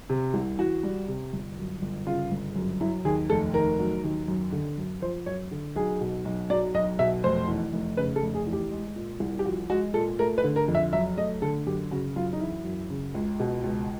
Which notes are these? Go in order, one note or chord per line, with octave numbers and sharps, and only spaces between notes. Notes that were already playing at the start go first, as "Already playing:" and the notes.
C3
C2
E3 F#4
G3
C3
G1
F#2
G1
C#3 F4
G1
F#2
F#3 E4
D#2 G#4
F1 A4
D#3 A#4
F#3
D#2
F#2
D3
F#2
F3 C5
F#2 C#5
D3
B1 G#4
B2
B1
F#3 D5
B1 D#5
B2 E5
F1 C5
E2
F1
C#3 B4
A4
F1
G#4
E2
G4
G#3
A#2
C2
G4
F3 F#4
G#3 F#4
A#2 A4
A3 A#4
B4
D3
A#4
F2
E5
F#3 E5
A3 D#5
D3 A4
F#2 G4
C#3 F#4
F#2 F4
D#4
E3 E4
F#2
C#3
C#2
B2
C#2